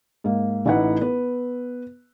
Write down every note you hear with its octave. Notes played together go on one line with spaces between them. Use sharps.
G#2 A#3
A1 A2 D#4 E4 B4 F#5
B3 B4